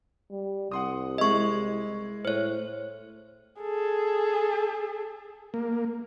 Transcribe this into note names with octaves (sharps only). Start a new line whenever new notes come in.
G3
C2 F#5 C6 D#6
G#3 E4 D#5 C#6
A2 C5 C#5
G#4 A4
A#3